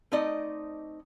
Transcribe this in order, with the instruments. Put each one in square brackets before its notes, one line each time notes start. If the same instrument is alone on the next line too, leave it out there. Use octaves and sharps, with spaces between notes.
[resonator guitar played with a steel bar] A3 C4 D#4 D5 D#5